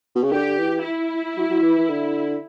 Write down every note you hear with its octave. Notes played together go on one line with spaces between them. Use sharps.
B2
C#3
D3 G4
E3
E4
F#3
F#3
E3
E3
D3